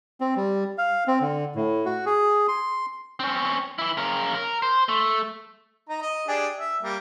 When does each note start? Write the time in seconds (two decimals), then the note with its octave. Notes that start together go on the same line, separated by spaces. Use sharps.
0.21 C4
0.36 G3
0.78 F5
1.08 C4
1.21 D3
1.55 A2
1.86 F#4
2.06 G#4
2.48 C6
3.20 C4 C#4
3.79 E3 E4
3.97 C#3 A#4
4.35 A#4
4.62 C5
4.89 A3
5.89 D#4 A#5
6.01 D#5
6.28 D4 G4 G#4
6.57 E5
6.83 G3 A#3